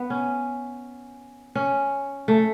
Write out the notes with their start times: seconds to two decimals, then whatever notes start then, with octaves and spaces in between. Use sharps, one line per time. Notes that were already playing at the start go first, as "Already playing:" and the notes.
Already playing: B3
0.10 C#4
1.55 C#4
2.28 A3